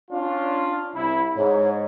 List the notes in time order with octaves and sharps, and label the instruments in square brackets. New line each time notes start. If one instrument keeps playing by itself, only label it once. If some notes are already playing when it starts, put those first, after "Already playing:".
[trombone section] C#4 D4 F4
C2 E4
[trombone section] G#2 [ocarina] C#5